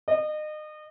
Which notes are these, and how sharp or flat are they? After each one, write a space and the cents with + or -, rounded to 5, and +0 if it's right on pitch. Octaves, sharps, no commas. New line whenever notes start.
D#5 -30